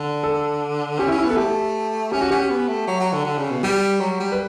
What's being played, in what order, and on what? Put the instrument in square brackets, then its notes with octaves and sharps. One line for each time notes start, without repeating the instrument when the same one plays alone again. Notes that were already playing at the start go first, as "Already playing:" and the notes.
Already playing: [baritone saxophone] D3
[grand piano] A4
[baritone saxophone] C#4 [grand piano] G4
[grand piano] E4
[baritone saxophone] C#4
[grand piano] E4
[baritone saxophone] B3
[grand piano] A4
[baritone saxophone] A3 [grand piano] G4
[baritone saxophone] C#4 [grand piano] G4
[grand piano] F#4
[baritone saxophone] C#4 [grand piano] G4
[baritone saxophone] B3
A3
F#3
F#3
D3
D3
C#3
B2
[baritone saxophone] G3 [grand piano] G4
[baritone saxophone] F#3
G3
[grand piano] B4